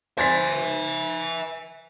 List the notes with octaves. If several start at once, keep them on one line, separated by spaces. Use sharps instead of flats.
C5 E5 G#5 A6 B6